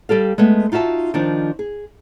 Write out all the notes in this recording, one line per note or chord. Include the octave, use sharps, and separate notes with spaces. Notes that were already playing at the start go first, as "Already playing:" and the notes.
G3 G4 A4 F5
G#3 A3 B3
D#4 F4 F#4 E5 A5
D#3 F3 D4
G#4